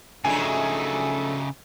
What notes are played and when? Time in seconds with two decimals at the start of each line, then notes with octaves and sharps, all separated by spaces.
0.25 F#2 C#3 F3 F#3 A3 D4 D#4 G#5